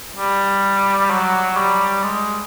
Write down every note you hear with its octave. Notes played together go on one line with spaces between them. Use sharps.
G3
F#3
G3
G#3